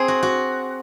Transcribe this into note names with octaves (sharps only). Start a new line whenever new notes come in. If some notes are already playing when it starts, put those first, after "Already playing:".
Already playing: C4 G#4
F#4
F#4